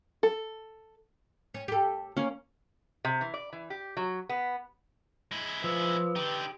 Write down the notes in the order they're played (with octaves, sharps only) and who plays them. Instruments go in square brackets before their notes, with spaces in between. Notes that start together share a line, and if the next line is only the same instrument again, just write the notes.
[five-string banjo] A4
[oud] C#4
G4 A4
[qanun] A#3 C#4
[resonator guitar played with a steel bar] C3
E3
D5
E3
G4
F#3
B3
[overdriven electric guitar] G#3 E4
[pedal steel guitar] F3 [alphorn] B4 [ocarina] E6
[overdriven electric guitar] D3 D#4 [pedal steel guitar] G4